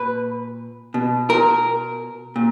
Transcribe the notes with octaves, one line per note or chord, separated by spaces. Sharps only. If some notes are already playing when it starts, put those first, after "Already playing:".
Already playing: A#2 B4
B2
A#4
A#2